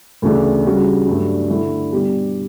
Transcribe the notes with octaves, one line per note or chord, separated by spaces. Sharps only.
D2 C#3 E3 A3 D4
C#3 G3 D4 F#4
G2 F#3 A3 D4
D3 A3 E4
B2 G3 D4 G4